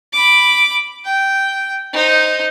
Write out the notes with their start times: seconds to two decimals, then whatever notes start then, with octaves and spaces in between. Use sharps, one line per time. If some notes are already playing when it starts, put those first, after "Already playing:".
0.13 B5 D6
1.05 G5
1.93 D#4 C5